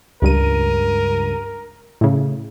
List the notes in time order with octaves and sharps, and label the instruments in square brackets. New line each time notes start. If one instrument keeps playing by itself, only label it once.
[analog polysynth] C#2 G2 D#7 [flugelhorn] A#4
[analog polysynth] A2 C#3